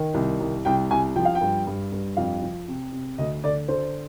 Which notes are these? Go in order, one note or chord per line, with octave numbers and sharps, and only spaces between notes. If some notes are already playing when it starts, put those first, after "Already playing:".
Already playing: D#3
C2
C2
C2 G5
C2 G#5
F3 G5
F5
G5
G2
G2
G2
F2 F5
F3
C3
C3
D2 D#5
D3 D5
D3 C5